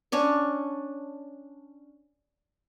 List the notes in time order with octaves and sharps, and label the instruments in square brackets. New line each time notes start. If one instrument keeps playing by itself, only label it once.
[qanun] C#4 D4 C#5